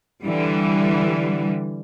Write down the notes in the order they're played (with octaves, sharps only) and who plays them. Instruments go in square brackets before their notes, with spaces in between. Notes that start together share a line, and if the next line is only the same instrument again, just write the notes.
[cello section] D3 E3 G3